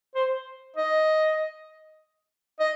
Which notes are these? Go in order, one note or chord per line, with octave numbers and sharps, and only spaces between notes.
C5
D#5
D#5